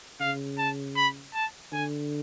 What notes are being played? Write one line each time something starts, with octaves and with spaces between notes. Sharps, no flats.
C#3 F5
A5
B5
A5
D3 G#5